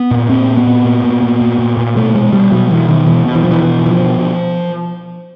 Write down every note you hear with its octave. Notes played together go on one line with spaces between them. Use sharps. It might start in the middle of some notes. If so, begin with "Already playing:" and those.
Already playing: B3
A#2
A#2 C4
A#2
B3
A#2
A#2
A#2
A#2
A#2
A#2
A#2
B2 A3
B2 G#3
B2 G3
B2 F#3
B2 E3
B2 D#3
B2 E3
B2
E3
B2 F3
E3
B2 E3
B2 E3
F3
B2
B2